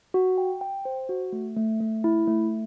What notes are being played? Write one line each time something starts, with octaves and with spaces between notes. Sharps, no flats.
F#4
G5
G5
C5
F#4
A3
A3
A3
E4
A3